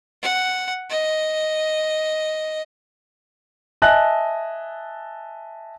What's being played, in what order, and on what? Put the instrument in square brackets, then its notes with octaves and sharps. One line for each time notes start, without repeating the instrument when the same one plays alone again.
[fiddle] F#5
D#5
[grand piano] D#5 E5 G#5 A5 F#6